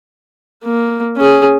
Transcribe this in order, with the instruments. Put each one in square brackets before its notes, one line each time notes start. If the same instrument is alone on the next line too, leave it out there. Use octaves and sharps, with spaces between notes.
[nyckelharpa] A#3
C#4 G#4